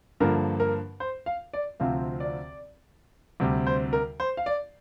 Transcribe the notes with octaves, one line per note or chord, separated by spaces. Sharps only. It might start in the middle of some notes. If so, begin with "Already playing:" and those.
G2 D3 F3 A#3 A#4
A#4
C5
F5
D5
D2 C3 F3 C4 F4 F5
D5
D2 C3 G3
C5
A#4
C5
F5
D5